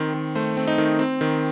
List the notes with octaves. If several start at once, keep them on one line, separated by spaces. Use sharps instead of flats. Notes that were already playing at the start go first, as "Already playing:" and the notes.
Already playing: D#3 C4 C5
D#3
A3 C5
C4
D#4
D#3
C4
D#3